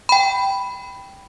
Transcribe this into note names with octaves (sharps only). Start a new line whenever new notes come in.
G5 B5